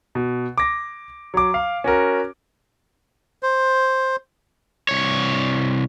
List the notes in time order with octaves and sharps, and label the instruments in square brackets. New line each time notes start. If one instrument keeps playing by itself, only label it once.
[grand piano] B2
D6 A#6
F#3 D6
F5
C#4 F#4 A#4
[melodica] C5
[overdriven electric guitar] C2 C#5